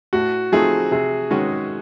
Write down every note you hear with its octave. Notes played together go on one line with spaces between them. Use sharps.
A2 F#4
F3 A3 C4 D#4 G#4
C3 G#4
D#3 G#3 C#4 F#4